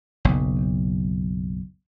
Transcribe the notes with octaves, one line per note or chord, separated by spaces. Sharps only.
F#1 B1